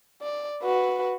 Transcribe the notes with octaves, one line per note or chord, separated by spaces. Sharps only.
D5
F#4 B4